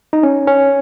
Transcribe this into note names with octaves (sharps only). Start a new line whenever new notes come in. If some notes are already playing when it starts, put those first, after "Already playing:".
D#4
C#4
C#4